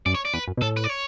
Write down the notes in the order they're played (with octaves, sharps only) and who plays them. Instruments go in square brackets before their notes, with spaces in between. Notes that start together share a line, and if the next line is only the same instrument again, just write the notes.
[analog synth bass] F#2 [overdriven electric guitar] D5
[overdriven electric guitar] C#5
D5
[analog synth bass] E2 [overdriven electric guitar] B4
[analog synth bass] F#2
B2
[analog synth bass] A2 [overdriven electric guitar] A4
[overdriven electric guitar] B4
D5
C#5